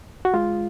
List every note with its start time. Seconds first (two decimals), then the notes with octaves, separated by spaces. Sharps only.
0.25 F#4
0.33 G#3 F4